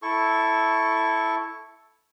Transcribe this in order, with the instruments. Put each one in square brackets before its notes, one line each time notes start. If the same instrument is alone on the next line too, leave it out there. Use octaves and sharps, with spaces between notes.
[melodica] E4 A4 C#6